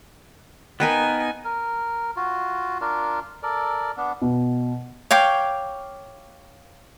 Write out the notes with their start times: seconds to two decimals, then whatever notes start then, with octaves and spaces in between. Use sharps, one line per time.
0.80 B3 D#4 A#4 B4 G5 G#5
1.45 A#4
2.17 F4 F#4
2.81 D4 F4 A#4
3.43 A4 A#4 D5
3.97 B3 D4
4.22 B2
5.11 C#5 F5 G5 D6